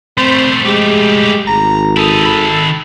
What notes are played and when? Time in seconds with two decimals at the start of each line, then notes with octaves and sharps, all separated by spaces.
0.18 G3 A3 C4 C5
0.66 G#3 G4
1.47 G#1 A#5
1.97 E4 A4 D#5
2.25 D#3 B5